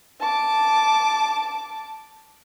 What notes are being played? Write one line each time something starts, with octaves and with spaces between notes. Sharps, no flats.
A5 D6